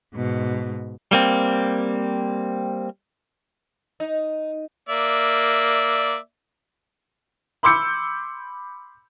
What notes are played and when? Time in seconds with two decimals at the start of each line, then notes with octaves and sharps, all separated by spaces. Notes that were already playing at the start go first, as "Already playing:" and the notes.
0.14 G#2 B2
1.11 G3 A#3 C4
4.00 D#4
4.89 A#3 D5 E5
7.63 B5 C6 D6 E6 G6 C#7